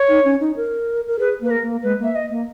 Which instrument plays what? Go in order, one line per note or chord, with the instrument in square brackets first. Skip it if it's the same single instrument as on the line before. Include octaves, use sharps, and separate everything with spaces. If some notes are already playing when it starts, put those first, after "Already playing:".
Already playing: [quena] C#5
[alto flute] D#4
C#4
D#4
A#4
A#4
[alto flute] G#4 [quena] B4
[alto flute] A#3 [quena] B4
[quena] A#4
[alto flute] A#3
[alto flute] G#3 [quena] B4
[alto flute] A#3 [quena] E5
[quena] D#5
[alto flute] A#3